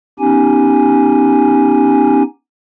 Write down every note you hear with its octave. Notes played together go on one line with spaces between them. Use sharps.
B3 C#4 D#4 G4 G#5